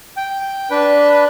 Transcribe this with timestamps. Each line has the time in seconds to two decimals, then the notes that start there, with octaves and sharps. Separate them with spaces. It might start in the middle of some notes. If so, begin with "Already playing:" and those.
0.17 G5
0.71 D4 B4